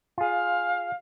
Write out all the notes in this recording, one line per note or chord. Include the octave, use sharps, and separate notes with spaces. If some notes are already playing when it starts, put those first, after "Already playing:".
F4 G#4 F5